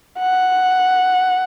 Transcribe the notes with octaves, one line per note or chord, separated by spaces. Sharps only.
F#5